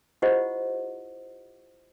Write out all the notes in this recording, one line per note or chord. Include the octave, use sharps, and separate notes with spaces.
E4 F4 G4 C5 D#5 F#5